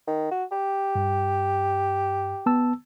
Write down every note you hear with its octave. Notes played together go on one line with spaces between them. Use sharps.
D#3
F#4
G4
G2
B3 A5 E6